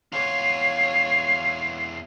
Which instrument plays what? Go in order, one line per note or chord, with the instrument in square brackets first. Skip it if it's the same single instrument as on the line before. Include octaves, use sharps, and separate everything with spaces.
[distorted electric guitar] E2 F4 [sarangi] C#5 [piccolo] C7